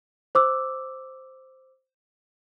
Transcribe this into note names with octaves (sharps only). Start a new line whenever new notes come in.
C5 D6 E6